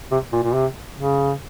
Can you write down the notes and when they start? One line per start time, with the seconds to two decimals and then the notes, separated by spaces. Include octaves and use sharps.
0.11 C3
0.33 A#2
0.43 A#2
0.54 C3
0.95 C#3